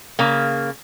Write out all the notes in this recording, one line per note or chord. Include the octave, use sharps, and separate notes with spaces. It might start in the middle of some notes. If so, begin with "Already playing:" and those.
C#3 A#3